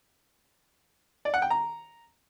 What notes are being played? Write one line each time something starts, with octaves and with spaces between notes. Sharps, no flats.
D5
F#5
G5
A#5